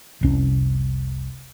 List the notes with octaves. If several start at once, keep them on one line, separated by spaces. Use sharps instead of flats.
F1 C2 C#4